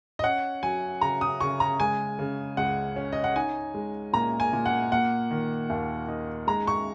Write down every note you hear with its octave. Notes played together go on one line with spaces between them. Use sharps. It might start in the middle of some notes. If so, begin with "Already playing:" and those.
D#5
C#4 F#5
F#3 G#5
C#3 A#5
D#6
C#3 C#6
A#5
G#3 G#5
C#3
C#2 F#5
C#4
D#5
F#5
D#4 G#5
G#3
A#2 A#5
G#5
A#2
F#5
A#3 F#5
D#3
D#2
D#4
G#3 A#5
C#6